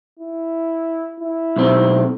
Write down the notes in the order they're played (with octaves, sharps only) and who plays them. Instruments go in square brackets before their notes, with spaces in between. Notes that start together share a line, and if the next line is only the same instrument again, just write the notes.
[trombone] E4
E4
[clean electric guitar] B1 C4